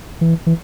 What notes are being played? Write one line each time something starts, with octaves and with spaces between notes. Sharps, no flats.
E3
E3